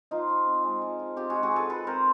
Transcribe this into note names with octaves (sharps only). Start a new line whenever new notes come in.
F3 D#4 F4
F3
C4
G#3
F3
F3
C4 F4 G4
G#3 F#4 G#4
F#4 G#4
F3 A4 B4
F3 A4 B4
C4 A#4 C5